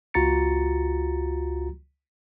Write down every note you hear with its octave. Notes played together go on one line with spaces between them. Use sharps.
C#2 F4 F#4 A#5 A6 C#7